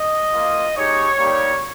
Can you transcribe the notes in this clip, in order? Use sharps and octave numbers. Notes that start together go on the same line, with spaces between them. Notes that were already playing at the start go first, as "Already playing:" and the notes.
Already playing: D#5
A#3 F4
G#3 D#4 G4 C#5
G3 A#3 D#4 G4